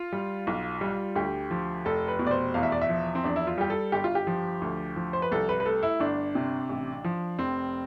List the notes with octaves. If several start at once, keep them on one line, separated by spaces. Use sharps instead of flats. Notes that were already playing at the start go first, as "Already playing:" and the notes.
Already playing: F4
G3
B1
G3
D2 G4
F3
F1 A4
B4
B2
D5
C5
E2 F5
E5
D5
E5
F3
C4
E2 D4
E4
F4
G3 G4
A4
G1 G4
F4
G4
F3
D2
F3
C5
B4
C2 A4
B4
B4
A3 A4
E4
G1 D4
C3
A1
F3
F1 C4